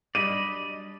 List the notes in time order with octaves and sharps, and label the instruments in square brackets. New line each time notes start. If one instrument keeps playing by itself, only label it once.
[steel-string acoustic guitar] F#3 G3 D4 [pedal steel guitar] D5 D#5 B5 [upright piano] D#7